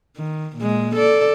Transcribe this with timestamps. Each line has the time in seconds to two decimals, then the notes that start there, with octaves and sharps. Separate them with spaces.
0.17 D#3
0.57 A#2 G#3
0.95 A4 D5